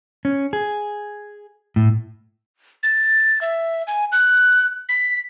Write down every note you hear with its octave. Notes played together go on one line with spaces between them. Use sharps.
C#4
G#4
A2
A6
E5
G#5
F#6
B6